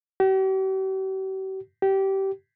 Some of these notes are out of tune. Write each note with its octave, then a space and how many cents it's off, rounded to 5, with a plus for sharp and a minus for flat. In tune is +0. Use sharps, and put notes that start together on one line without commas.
G4 -45
G4 -20